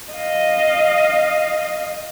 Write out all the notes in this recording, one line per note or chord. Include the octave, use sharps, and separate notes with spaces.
D#5 F5